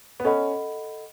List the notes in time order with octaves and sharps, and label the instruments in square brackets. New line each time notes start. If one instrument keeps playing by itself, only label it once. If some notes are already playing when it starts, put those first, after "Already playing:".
[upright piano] B3
[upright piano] C#4 [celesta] A4 D#5 F#5 B5